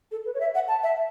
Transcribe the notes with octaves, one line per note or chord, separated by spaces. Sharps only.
A4
B4
C#5
E5
F#5
A5
E5